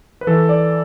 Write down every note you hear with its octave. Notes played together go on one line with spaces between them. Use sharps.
B4
E3 A4
D5